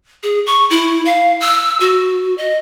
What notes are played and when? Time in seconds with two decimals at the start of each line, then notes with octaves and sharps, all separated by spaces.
0.23 G#4
0.46 C#6
0.70 E4
1.05 F5
1.41 E6
1.80 F#4
2.38 D#5